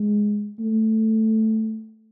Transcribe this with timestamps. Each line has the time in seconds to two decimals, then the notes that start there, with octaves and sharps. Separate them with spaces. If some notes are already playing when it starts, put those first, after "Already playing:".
Already playing: G#3
0.60 A3